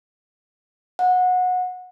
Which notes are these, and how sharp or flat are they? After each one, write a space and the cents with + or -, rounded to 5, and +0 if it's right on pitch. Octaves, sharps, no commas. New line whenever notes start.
F#5 -20